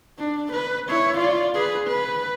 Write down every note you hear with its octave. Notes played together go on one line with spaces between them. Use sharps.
D4
B4
E4 C#5
F4 D5
G#4 B4
B4